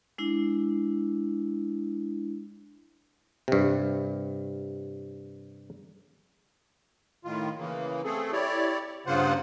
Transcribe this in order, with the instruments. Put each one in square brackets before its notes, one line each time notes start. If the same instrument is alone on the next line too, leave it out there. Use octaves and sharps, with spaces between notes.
[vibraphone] G#3 D4 E4
[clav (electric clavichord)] G2 C3
[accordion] A2 D#3 F4
C#3 E3 A#3
A3 C4 G#4 A4
E4 G4 C#5 D5
G2 C#3 A#3 F4 C5 F#5